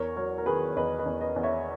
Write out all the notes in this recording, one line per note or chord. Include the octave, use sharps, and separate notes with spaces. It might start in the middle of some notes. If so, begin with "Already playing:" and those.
Already playing: E2 A#4 C#5
F#3 A#4 C#5
A#4
D#3 G#4 B4
C#5
E2 B4 D#5
B4 D#5
E2
B4 D#5
E2
C#5 E5